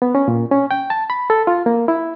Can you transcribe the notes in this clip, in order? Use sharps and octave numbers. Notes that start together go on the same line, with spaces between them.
B3
C#4
A#2
C#4
G5
A5
B5
A4
F4
A#3
E4